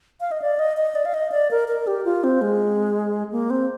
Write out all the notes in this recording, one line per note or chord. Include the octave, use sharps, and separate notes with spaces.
F5
D#5
D5
D#5
D#5
D5
F5
D#5
D5
A#4
A#4
G4
F4
C4
G#3
A#3
C4